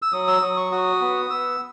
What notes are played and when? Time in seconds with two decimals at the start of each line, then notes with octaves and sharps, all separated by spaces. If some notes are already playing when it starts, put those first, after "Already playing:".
0.02 E6
0.13 F#3 D#6
0.28 E6
0.42 F#3 D#6
0.57 C#6
0.71 F#4 D#6
1.01 B3
1.30 B3 E6